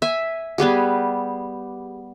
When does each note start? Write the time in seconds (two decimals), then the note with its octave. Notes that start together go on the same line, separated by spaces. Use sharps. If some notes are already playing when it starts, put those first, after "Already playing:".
0.02 E5 G#5
0.58 G3 B3 G4 G#4